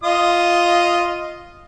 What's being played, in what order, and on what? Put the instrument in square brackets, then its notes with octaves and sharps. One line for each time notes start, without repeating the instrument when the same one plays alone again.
[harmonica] F4 D#5 D#6